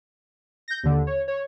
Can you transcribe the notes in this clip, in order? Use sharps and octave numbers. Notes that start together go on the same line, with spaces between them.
G6 A#6
D#2 D3
C#5
C#5